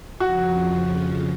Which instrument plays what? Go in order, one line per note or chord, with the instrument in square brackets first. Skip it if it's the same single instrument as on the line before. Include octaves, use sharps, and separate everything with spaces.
[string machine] F2 C#3 F3 [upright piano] F#4